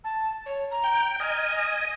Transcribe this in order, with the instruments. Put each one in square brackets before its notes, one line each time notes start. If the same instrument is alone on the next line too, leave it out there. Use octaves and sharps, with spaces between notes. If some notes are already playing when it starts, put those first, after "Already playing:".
[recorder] A5
C#5
A#5
[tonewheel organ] G5 G6
[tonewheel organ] D#5 G#5 [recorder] F6